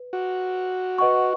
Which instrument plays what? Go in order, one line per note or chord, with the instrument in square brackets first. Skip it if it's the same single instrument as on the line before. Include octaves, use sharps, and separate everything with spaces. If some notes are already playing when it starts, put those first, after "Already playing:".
Already playing: [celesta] B4
[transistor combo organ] F#4
[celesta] B4 D#5 F#5 C#6